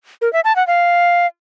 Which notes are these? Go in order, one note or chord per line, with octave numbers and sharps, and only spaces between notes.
A#4
E5
A5
F#5
F5